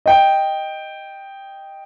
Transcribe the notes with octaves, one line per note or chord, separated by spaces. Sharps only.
D#5 G5